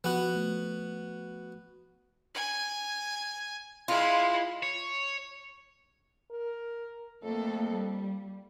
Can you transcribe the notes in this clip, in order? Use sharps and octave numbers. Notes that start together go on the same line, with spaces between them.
F3 B3 F#4
A3
G#5
G#3 E4 F4
C#5
A#4
F2 A3 A#3 A4
G3